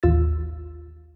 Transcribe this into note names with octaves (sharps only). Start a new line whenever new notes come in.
A1 D#2 F4 E6 A6